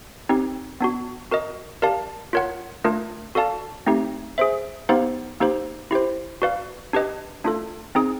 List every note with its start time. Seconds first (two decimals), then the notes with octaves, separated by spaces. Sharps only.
0.29 C4 D#4 G4
0.80 B3 D4 F#4
1.31 F#4 A#4 D#5
1.82 G4 A#4 D5 F5 A5
2.33 F4 A#4 C#5 F#5
2.84 A3 D4 F4 A#4
3.35 F#4 A4 D5 F5 A5
3.87 A3 C4 D#4 G4
4.38 G#4 C5 E5
4.89 B3 D#4 G4 C5 F5
5.40 A#3 D#4 G4 C5
5.91 E4 G4 C5
6.42 F#4 B4 D5 F5
6.93 D4 G4 B4 D#5
7.44 A3 D4 F4 A4
7.95 C4 D#4 G#4